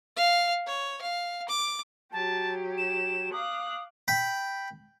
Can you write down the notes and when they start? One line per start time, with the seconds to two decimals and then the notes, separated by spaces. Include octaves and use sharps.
0.17 F5
0.67 C#5
1.01 F5
1.49 D6
2.12 F#3 G4 A5
2.78 E7
3.33 F5 D6 D#6 F#6
4.08 G5 B5